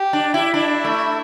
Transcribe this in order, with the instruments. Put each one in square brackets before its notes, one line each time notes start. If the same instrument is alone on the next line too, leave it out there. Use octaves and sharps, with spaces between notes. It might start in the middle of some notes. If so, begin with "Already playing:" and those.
Already playing: [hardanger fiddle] G4
[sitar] D4
E4
[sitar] D4 [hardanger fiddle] E4
[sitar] A3